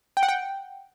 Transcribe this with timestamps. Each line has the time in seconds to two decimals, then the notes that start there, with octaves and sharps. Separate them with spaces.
0.17 G5
0.23 F#5
0.29 G5